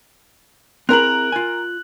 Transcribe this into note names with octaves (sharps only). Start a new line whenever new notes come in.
C4 E4 G#4 A#4 F#6 F7 F#7
F4 G#5